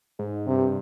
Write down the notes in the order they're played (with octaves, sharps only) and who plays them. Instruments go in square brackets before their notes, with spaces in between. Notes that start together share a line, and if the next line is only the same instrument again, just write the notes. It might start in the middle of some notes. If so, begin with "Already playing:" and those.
[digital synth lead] G#2
[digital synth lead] G2 [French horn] C3